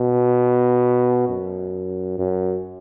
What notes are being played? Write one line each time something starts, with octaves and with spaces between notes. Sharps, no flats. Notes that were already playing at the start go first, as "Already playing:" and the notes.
Already playing: B2
F#2
F#2